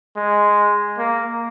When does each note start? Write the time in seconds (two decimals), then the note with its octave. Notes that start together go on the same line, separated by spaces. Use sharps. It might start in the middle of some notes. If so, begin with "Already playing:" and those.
0.16 G#3
0.98 A#3